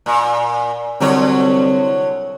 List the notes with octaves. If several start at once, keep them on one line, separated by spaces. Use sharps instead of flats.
A#2
C2 D3 F#3 C#5